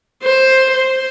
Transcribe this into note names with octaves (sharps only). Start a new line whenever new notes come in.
C5
C5